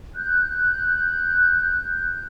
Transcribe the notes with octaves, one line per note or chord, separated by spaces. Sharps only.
F#6 G6